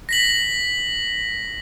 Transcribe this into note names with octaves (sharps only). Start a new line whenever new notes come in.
A#6 B6 F#7